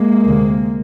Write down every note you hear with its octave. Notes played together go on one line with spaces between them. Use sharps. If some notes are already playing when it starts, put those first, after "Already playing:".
Already playing: G#3 A#3
D2 C3